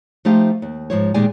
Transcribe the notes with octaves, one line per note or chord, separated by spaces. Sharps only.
F3 A3 D#4 F4 G4 F5
D#2
G#2 F3 C#5
A#2 D#3 G#3 G4 D5 G#5